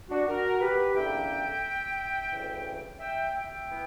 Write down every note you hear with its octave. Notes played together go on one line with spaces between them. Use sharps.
D4 F#4
F#4 A#4
G4 B4
E2 D3 A#3 C#4 E5 G5
D2 C#3 E3
E5 G5
E5 G5
E3 B3